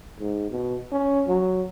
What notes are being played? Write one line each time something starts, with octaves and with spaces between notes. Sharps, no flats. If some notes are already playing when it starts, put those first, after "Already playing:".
G#2
B2
C#4
F#3